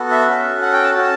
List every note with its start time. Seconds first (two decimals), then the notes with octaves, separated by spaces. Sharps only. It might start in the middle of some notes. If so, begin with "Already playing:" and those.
Already playing: B3 F#4 A4
0.11 E5
0.28 C#4 F#4 A4
0.62 F#5
0.73 G5
0.84 A5
0.95 C#4 F#4 A4 A5